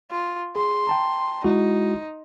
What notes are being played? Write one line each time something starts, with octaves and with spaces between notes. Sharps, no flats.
F4
G#4 C6
G5 A5 A#5
G#3 D#4 E4 F#4